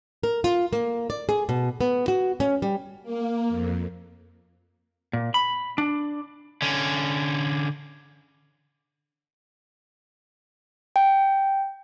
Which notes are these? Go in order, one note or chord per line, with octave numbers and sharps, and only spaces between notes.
A#4
F4
A#3
D5
G#4
B2
B3
F#4
C#4
G3
A#3
F2
A#2
B5
D4
D3 C#4
G5